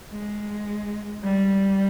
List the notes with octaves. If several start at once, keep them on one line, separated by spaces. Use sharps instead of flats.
G#3
G3